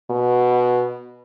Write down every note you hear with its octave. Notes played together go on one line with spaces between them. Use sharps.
B2